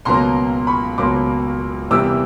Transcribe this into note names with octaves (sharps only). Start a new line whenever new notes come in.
C#2 B2 F#3 A#3 A#5 C6
B5 C#6
C#2 B2 F#3 A#3 C6 D6
E2 C3 E3 G3 A#3 D6 E6